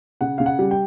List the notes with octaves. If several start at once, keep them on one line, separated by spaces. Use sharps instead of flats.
C#3 F#5
C#3 F5
F#5
G3
G5